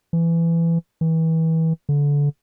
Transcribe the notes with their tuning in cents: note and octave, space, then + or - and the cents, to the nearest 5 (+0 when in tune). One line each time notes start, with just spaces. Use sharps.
E3 +20
E3 -30
D3 -25